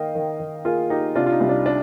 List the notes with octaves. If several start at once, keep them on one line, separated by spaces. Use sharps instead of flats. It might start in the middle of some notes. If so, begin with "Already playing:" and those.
Already playing: D#3 A#3 D#5 F5 G5
D#3
D#3
A#3 F4 G#4
A#3 D#4 G4
C3 D4 F4
F4
D#4
C2
D4
D4